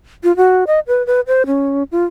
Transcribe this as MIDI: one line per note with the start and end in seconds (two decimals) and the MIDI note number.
0.24 0.35 65
0.37 0.64 66
0.67 0.80 75
0.87 1.05 71
1.07 1.21 71
1.27 1.46 72
1.46 1.83 61
1.92 2.05 65